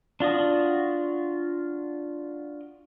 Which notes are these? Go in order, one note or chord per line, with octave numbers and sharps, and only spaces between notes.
D4 F4 F#4 D#6